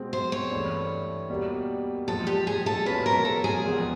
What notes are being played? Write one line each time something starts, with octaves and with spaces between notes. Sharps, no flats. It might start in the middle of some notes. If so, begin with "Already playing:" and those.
Already playing: B2 G#3 C4
C5
C#5
G2 E3 A3
B2 G3 A#3
A#2 F3 G#3 A4
G4
G#4
A4
B2 G#3 C#4 F4 B4
A#4
A4
G#4
E2 C3 F3 G#3 B3